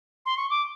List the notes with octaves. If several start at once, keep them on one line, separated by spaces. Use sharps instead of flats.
C6
C#6
D6